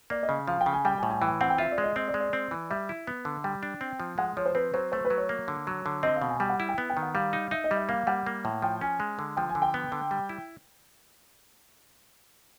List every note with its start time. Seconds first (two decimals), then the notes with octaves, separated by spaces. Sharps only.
0.10 A#3 D5
0.23 D#5
0.29 C#3
0.48 F3 F5
0.61 G5
0.66 C#3
0.73 G#5
0.85 G3 G5
0.98 G#5
1.03 A2
1.10 G#5
1.21 E3 G5
1.41 C4 F#5
1.50 G5
1.58 F4 E5
1.72 D5
1.78 G#3
1.84 D#5
1.96 C4 D#5
2.08 D5
2.14 G#3
2.20 D5
2.33 C4
2.51 E3
2.70 G3 E5
2.89 E4
3.07 B3
3.25 D3
3.44 G3 G5
3.63 D4
3.81 C4
4.00 F3
4.18 G#3 F#5
4.37 F3 C#5
4.46 C5
4.55 C4 B4
4.74 F#3 C5
4.92 A3 C5
5.05 B4
5.10 F#3
5.17 C#5
5.29 A#3
5.48 D3
5.67 F#3
5.86 D3
6.03 C4 D#5
6.16 F5
6.22 B2
6.28 G#5
6.40 G3 G5
6.50 F#5
6.60 E4
6.69 G5
6.78 B3
6.90 G5
6.97 D#3
7.03 F#5
7.15 G3 F5
7.33 D#4
7.51 D#4 E5
7.64 D#5
7.71 G3
7.76 E5
7.89 A#3 F5
8.07 G3 F#5
8.26 A#3
8.45 A2
8.62 F3 G5
8.81 C#4 G#5
9.00 G#3
9.19 D3
9.37 F3 G5
9.49 G#5
9.55 D3
9.62 G5
9.74 B3
9.92 D3
10.11 G3
10.29 E4